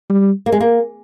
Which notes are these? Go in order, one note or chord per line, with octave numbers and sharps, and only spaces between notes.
G3
A#3
G#3
A#3